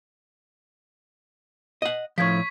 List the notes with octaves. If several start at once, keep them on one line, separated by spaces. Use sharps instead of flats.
D#5 F#5
A2 F3 C#6 G#6 B6